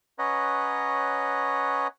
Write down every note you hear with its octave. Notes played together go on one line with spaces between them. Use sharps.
C#4 B4 C#5 D#5 F#5 A#5